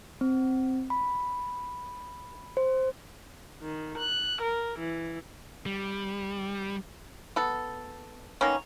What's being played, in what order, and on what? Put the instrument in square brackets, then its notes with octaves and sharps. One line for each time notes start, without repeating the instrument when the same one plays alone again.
[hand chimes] C4
B5
C5
[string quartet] D#3
F#6
A#4
E3
[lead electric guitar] G3
[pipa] B3 A4
D#3 A#3 B3 C#4